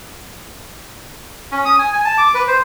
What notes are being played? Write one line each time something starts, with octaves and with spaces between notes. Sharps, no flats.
C#4
D#6
G#5
G#5
A5
D6
B4
C5